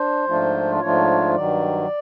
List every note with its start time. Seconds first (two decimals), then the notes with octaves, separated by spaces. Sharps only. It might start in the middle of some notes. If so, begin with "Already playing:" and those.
Already playing: D4 C5
0.28 G#2 F3 A3 D4 F4
0.81 G#2 F3 A3 D4 F4 C#5
1.36 G2 D#3 F#3 D5